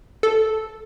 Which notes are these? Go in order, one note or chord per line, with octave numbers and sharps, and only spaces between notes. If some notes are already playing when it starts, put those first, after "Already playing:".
A4